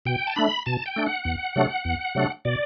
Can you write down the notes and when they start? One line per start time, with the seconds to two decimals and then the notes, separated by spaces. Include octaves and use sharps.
0.06 B2 G5
0.27 A5
0.36 A3 D4 B5
0.66 B2 A5
0.86 G5
0.96 A3 D4
1.06 F#5
1.25 E2
1.56 C3 F#3 A3 D4
1.85 E2
2.15 C3 F#3 A3 D4
2.45 B2 D5